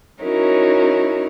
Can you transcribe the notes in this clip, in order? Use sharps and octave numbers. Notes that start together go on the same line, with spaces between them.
C#4 D#4 E4 F#4 A#4 C#5